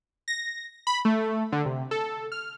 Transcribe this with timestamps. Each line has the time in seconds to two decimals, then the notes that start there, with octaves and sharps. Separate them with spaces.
0.28 A#6
0.87 B5
1.05 A3
1.52 D3
1.66 C3
1.91 A4
2.32 F6